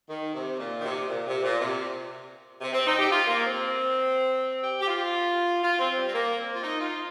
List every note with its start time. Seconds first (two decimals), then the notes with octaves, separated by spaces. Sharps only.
0.09 D#3
0.34 C3
0.59 A#2
0.80 D#3
0.84 C3
1.09 A#2
1.27 C3
1.43 A#2
1.60 C3
2.61 C3
2.73 C4
2.86 D#4
2.98 G4
3.11 F4
3.27 A#3
3.44 C4
4.62 G4
4.81 G4
4.87 F4
5.62 F4
5.79 C4
5.96 G3
6.07 C4
6.13 A#3
6.38 C4
6.54 F4
6.63 D#4
6.80 F4